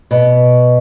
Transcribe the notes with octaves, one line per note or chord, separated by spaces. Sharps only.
B2